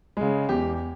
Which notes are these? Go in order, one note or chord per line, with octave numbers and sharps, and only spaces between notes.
C#3 G#3
E2 G4